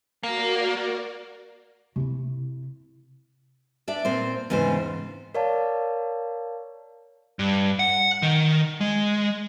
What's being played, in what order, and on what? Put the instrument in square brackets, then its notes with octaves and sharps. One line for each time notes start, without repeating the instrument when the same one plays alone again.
[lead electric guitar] A#3 [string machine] F#4 A#4 D5
[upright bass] C3 E4
[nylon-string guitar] D4 D5 E5
A#2 C4 C5
E2 G#2 C#3 C4 C5
[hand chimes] A#4 C#5 D5 F5 A5
[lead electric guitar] G2
F#5
D#3
G#3